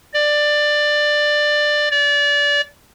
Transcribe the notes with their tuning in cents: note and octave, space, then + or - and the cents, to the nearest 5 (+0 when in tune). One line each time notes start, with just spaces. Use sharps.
D5 +15
D5 -25